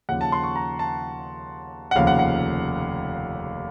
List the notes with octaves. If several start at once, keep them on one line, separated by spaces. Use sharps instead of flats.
D#2 C#3 F3 A#3 F#5
A5
C6
C#6
A#5
A5
F#5
F1 D#2 C#3 F3 F5
F#5
F#5